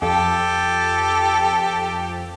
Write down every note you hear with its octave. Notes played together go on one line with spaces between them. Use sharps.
F2 G4 A4